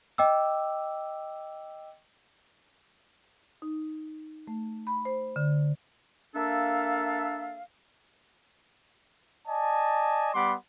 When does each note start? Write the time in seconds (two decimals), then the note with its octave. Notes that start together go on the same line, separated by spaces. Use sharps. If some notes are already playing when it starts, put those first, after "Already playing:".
0.18 D#5 G5 D6 E6
3.62 D#4
4.48 A3
4.87 B5
5.05 C5
5.36 D3
6.35 A#3 D4 A4 E5 F5
9.47 D5 D#5 G#5 A5
10.34 G3 B3 F#5 B5 C6 D6